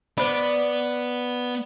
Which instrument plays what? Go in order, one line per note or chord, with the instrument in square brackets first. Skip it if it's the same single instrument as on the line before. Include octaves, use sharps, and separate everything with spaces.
[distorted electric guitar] B3 [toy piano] C5 F#5 B5 [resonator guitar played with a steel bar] D5